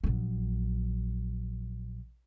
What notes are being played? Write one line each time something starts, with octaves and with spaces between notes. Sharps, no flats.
A#1 F#3